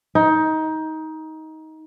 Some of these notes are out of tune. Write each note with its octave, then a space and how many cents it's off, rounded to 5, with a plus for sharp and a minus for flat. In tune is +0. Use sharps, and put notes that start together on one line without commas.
D#4 +20